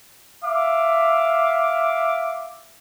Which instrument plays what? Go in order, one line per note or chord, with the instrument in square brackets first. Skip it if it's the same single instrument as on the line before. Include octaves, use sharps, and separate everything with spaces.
[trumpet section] E5 F5 D6